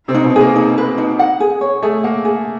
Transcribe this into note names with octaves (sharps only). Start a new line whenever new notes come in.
C3 C4
D#4
B2 B3
A#3 G#4
D#4
B4
D#4
F#5
G#4
C#5
A3 G#4
A#3 F#5
G#4